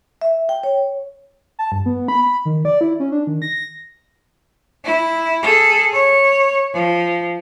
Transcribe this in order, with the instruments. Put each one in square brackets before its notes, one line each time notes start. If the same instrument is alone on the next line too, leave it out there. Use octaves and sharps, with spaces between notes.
[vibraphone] E5
G5
C#5
[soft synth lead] A5
G2
B3
B5
B5
D#3
D5
E4
C#4
D4
D#3
A#6
[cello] E4
G#4 A4
C#5
F3